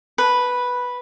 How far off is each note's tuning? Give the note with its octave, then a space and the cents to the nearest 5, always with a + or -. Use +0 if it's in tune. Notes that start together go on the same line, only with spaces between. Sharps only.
B4 -5